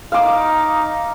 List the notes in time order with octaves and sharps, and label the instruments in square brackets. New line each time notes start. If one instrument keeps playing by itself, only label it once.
[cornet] D#4 [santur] F5 D6